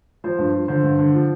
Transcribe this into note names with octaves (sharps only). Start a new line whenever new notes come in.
F3 C5
G2
F3
D3 C5
G2
D3
F3